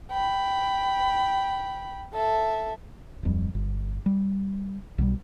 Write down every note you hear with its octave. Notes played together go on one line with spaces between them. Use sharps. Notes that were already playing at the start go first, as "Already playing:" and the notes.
G5 B5
A4 E5
D1 F2 G3
G1
G3
B1 B2 F#3 G3